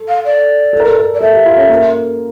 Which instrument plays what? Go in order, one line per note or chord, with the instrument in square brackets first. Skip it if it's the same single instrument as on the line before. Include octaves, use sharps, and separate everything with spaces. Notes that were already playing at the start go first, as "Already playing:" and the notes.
Already playing: [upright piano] A4
[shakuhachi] F5
D5
[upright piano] A4
A#4
A4
A#4
[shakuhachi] D5
[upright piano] A4 [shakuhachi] E5
[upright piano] G4
F4
C#4
A#3